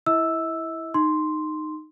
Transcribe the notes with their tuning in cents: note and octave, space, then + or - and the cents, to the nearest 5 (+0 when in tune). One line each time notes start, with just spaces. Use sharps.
E4 +0 E5 -45 E6 +0
D#4 -10 C6 +0